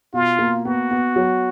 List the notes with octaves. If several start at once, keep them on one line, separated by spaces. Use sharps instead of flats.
B2 F4
A#3
B3 F#4
B3
F#3